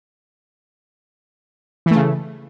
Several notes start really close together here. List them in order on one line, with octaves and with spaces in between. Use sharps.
E3 A3 C#3